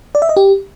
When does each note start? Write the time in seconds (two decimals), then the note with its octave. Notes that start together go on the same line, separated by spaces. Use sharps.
0.15 D5
0.22 E5
0.29 D#5
0.37 G4